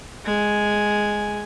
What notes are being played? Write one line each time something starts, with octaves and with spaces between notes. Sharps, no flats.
G#3 G#5